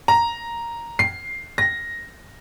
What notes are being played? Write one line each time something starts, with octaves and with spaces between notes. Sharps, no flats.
A#5
C7
A#6